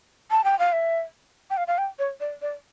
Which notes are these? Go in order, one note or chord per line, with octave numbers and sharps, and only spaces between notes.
A5
G5
F5
E5
G5
F5
F5
G5
C#5
D5
D5